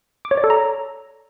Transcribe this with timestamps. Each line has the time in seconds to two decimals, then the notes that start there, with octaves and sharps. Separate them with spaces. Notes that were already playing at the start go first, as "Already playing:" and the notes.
0.25 D6
0.31 C#5
0.37 D5
0.44 A4
0.50 A#5